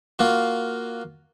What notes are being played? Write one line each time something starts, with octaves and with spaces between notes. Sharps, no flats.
A#3 F4 F#4